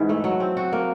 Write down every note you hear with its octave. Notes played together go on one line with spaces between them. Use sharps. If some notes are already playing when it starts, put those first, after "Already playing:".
Already playing: G#2 E3
A3
F#3
C4
F#4
A#3